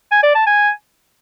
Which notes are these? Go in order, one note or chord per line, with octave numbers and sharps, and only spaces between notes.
G#5
D5
A5
G#5